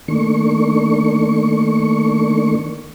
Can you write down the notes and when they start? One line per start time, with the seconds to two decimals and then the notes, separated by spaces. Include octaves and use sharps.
0.08 D#3 A3 A#3 D4 C#6